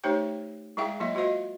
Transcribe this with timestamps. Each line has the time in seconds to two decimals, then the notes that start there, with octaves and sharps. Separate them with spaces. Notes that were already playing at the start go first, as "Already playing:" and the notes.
0.04 A3 D#4 G4 C5 C#5 G5
0.77 G#3 E4 G#4 E5 F5 G5
1.00 F#3 A#3 F4 D#5 E5
1.15 F4 F#4 C5 D#5 F5